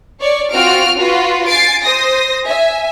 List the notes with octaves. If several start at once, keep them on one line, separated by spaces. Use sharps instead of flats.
C#5 D5 C#6
C4 F4 F#4 F6 D7
F4 F#4 B4
G#5 A6 C7 D7
C5 D#6 A#6
E5 G#5